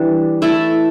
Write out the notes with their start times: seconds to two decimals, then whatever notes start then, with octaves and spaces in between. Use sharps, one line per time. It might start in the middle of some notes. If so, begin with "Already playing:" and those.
Already playing: E3 G3 D4
0.42 A3 E4 A4